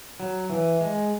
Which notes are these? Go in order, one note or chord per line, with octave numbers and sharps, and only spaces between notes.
F#3
E3
G#3